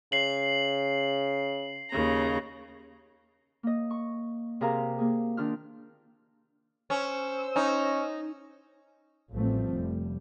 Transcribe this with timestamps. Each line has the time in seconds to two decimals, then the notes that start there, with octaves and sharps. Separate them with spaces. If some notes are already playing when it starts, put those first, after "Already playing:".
0.12 C#3 C7 F#7
1.90 D#2 C#3 A#5
3.63 A#3 D#5
3.91 C#6
4.61 C3 G#4 A#4 F5 A#5
4.98 A#3 G#4
5.37 D#3 D4 F4 F6
6.90 C#4 C5 E6
7.56 C#4 D#4
9.34 A1 F3 G3 A3 C4
9.76 F1 G3